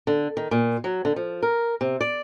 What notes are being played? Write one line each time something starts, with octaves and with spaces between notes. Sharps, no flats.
D3
D#3
A#2
F#3
D3
F3
A#4
C3
D5